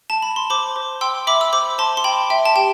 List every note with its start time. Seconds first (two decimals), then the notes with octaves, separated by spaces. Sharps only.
0.10 A5
0.22 B5
0.36 C6
0.50 C5 B5 D6
0.76 C5
1.01 G5 C6 E6
1.27 E5 B5 D6
1.41 E6
1.53 C5 B5 D6
1.78 C5 A5 C6
1.97 C6
2.04 G5 B5
2.30 E5 G5
2.46 A5
2.56 G4 G5